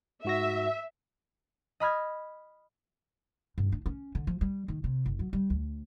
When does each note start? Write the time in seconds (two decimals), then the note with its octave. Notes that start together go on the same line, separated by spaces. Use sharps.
0.25 G#2 F#4 E5 A#6
1.80 D#5 B5 F6 G#6
3.58 G2
3.72 D4
3.86 C#4
4.15 D3
4.27 F3
4.41 G3
4.68 D#3
4.84 C3
5.06 F#1
5.19 F#3
5.33 G3
5.50 D2